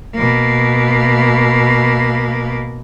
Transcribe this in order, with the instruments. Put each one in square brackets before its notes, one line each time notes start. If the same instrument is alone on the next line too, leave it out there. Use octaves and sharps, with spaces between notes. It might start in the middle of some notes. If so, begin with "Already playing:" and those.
[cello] B2 A#3